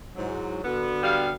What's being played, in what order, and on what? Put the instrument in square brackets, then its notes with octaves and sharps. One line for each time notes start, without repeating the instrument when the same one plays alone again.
[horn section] G#2 F#3 [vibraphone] E4
[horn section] D3 B3 [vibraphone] F#4 E6
[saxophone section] G3 F5